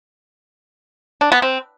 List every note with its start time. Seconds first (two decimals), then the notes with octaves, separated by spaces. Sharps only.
1.21 D4
1.32 B3
1.42 C4